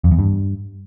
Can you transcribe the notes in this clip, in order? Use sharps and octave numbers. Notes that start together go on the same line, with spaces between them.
F2
E2
G2